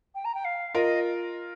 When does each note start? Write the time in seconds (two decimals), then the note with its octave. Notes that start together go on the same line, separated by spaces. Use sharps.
0.14 G5
0.24 A#5
0.34 G5
0.44 F5
0.74 F4 A#4 D#5